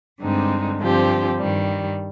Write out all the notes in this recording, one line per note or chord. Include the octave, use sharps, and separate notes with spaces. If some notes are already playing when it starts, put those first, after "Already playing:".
G2 D3 G#3 C4 D#4
G2 D3 F3 C4 G4
G2 D#3 G3